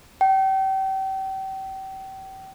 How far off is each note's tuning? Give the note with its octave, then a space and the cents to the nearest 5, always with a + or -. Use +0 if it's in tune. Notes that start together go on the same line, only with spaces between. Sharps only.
G5 -35